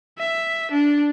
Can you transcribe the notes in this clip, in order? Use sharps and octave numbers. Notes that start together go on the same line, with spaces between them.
E5
D4